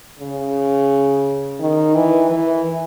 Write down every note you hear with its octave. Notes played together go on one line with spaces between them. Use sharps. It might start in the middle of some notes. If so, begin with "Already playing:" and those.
C#3
D#3
E3
E3